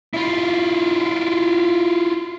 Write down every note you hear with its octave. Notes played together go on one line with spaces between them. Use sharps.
E4 F4